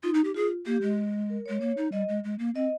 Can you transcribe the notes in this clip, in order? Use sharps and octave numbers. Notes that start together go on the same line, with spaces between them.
D#4 F4
D#4
G4
F4 G#4
A#3 G4
G#3
A#4
C#5
G#3
A#3 C#5
D#4
G3 D#5
G#3
G#3
A#3
C4 D#5